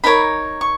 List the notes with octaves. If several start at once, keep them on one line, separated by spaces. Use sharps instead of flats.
D#4 A#4 C#5 B5
C#6